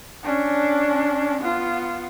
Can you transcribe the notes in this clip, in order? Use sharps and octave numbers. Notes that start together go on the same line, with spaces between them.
C#4 D4
B3 F4